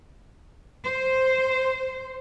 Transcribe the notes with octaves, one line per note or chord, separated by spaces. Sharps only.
C5